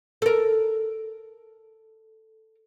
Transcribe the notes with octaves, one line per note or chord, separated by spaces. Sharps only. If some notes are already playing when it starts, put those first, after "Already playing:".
A4 A#4